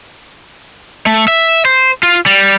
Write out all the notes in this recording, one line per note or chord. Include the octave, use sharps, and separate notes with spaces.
A3
E5
C5
F4
G3